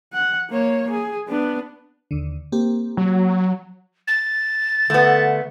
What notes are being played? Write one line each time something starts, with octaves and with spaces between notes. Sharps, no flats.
F#5
A#3 C#5
G#4
B3 D4
D#2 D3
A#3 C4 G4
F#3
A6
D3 A3 B3